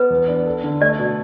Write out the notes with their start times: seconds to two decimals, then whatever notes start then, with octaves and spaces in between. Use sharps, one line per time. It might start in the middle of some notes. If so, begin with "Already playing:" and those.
Already playing: B3 B4
0.10 E2
0.28 D4
0.46 A4
0.63 D3
0.81 A3 D5
0.99 B2